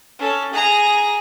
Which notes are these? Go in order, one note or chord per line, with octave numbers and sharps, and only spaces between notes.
C#4 A4
G#4 A#5